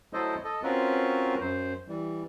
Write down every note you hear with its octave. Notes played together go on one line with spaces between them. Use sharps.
F#3 A3 E4 A4 C5 D#5
A4 D#5
C4 C#4 F4 F#4 A#4 B4
F#2 C5
E3 G3